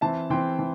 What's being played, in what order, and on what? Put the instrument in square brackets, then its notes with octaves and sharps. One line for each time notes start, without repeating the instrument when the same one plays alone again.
[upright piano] E3 C4 E5 A5
E3 C4 G5 C6
E3